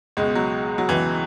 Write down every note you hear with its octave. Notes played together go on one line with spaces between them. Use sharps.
C#2 B2 G#3
F#3
F#3
C#2 B2 E3